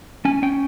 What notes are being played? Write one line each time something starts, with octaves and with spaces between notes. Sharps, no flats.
C#4 G#5
C#4 G5